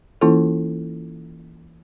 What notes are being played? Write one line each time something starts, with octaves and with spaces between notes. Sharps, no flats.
E3 A#3 C#4 E4 F4 A4